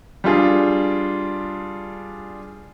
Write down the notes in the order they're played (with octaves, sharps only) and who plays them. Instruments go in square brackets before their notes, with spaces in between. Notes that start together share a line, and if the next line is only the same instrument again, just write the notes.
[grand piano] G3 D4 F4 G#4